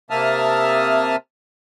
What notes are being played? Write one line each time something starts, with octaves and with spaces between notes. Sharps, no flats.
C3 A#3 E5 A5 D#6 F6